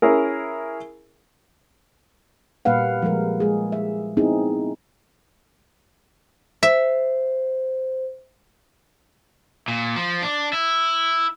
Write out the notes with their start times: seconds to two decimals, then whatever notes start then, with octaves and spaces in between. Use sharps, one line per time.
0.02 C#4 E4 G#4 A#4
2.65 A#2 G3 A#3 B4 F5 F#5
3.02 F3 G3 G#3 A#4
3.40 G#3 G#4
3.72 E5
4.17 B3 C4 D#4 E4 G#4
6.63 C5 E5
9.68 A#2
9.96 F3
10.22 D4
10.53 E4